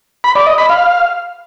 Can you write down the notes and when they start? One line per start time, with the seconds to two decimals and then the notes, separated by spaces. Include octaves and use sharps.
0.24 B5
0.35 D5
0.47 D#5
0.58 B5
0.69 F5